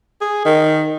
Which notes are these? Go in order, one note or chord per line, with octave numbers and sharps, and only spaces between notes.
G#4
D#3